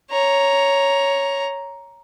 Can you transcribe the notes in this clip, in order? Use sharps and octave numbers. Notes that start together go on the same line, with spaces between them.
C#5 A#5